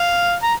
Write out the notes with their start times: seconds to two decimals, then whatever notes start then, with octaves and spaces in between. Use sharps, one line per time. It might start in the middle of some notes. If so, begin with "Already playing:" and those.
Already playing: F5
0.43 A#5